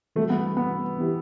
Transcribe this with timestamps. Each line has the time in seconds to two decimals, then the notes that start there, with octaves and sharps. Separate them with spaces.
0.16 E3 G3 A3 C4 F#4
0.30 B3
0.57 B3
0.98 E3 B3 E4 G4 B4